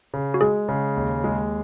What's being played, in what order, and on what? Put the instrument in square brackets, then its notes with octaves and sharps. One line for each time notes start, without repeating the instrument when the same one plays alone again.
[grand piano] C#3
[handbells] F#4
[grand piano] G#3 [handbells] G#4
[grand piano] C#3
D#2
G#3